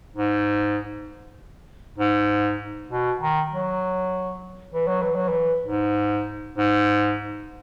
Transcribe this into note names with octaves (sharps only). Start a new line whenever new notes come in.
G#2
G#2
B2
D#3
F#3
E3
F#3
E3
F#3
E3
G#2
G#2